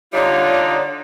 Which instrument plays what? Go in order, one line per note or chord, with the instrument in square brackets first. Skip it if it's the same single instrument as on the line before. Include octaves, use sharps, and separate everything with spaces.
[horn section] D3 G3 D#4 [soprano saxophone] F4 [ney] C#5